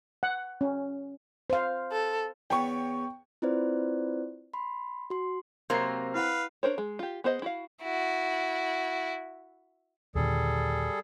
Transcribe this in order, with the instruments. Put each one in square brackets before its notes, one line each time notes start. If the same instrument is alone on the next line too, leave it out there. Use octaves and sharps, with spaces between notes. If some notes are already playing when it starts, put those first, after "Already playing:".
[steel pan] F#5
C#4
[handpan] C5 F5
[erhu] A4
[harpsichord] E2 B3 C#5 [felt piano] G5 C#6
[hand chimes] C4 E4 F4 B4 C5 D5
B5 C6
F#4 C6
[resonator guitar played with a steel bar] C3 F#3 A#3 [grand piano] C4 A#5 C7 [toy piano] C6
[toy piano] E4 F#5 [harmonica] B4 F5
[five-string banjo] D4 A#4 C5 C#5
G#3
F4 G4
B3 G#4 C5 D#5
E4 F#4 F5
[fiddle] E4 F#4
[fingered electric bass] D#2 A#2 D3 [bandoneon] G3 G#4 A4